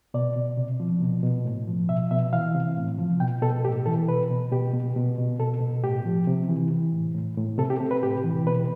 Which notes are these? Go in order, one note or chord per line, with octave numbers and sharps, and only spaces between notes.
B2 D5
B2
C3
F3
B2
B2
A2
F3
B2 E5
B2 E5
E3 F5
C3
A2
F3
B2 G5
B2 A4
A2 G4
E3 A4
B2 B4
B2
B2 G4
B2
B2
B2
B2 A4
B2
A2 G4
F3
C3
E3
E3
A2
A2
A2
C3 A4
G4
C3 A4
B4
A2 G4
E3
B2 B4